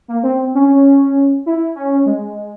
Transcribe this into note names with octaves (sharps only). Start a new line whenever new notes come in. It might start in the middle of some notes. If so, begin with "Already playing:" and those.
A#3
C4
C#4
E4
C#4
G#3